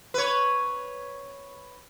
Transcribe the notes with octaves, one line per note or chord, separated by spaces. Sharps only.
B4 C#5